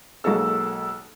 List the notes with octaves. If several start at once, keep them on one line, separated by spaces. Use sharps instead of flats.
B1 F#3 G#3 A#3 A4 E6